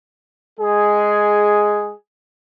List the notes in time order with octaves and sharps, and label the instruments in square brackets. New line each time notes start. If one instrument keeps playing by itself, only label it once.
[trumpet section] G#3 G#4